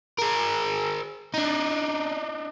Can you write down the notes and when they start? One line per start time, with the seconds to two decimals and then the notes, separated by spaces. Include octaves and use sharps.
0.18 G#4 A#4
1.34 D4 D#4